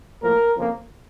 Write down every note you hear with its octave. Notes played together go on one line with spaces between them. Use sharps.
A2 F3 A#3 A#4
F2 C#3 F3 A#3